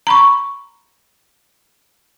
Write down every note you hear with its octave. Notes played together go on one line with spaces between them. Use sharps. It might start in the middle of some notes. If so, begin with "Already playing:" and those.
A#5 B5 C#6